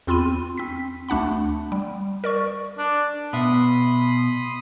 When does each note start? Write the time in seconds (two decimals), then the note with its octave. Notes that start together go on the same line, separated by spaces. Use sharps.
0.07 E2 C4 F4 B5 C6 D#7
0.58 C4 B6
1.09 D2 A3 D4 F#5 B5
1.72 G3
2.24 A#4 D5 C#6
2.78 D4
3.33 B2 E5 B5 C6 D#6